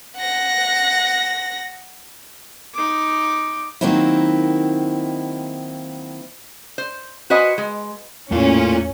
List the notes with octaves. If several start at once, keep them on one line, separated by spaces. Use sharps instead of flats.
F#5 A#6
D#4 D6
D#3 F#3 A#3 C4 D#4 E4
C5
F#4 B4 C5 D#5 G#5
G#3
E2 A2 A#3 C#4 F4